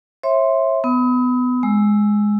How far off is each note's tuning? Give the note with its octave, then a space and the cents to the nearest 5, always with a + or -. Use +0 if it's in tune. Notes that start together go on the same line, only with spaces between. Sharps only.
C#5 -40 E5 +0 C6 +0
B3 +20 D#6 +40
G#3 +0 E6 +0